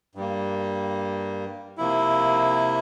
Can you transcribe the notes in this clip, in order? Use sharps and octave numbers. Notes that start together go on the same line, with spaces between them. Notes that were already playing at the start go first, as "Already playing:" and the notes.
G2 G3 A#3
C3 F3 A#3 E4